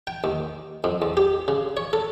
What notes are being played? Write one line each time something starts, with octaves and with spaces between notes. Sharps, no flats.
G5
D#2
F2
E2
G4
C#3
C#5
A4